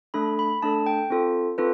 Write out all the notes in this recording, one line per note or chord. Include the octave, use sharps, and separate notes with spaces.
A3 D4 A4 B5
B5
A3 D4 A4 A5
G5
C4 F4 A4
C4 F4 A4 B4